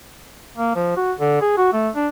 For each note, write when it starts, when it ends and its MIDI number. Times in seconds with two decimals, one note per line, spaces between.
0.58 0.73 58
0.76 0.94 53
0.97 1.13 66
1.20 1.38 50
1.41 1.52 68
1.58 1.71 66
1.73 1.89 57
1.95 2.08 62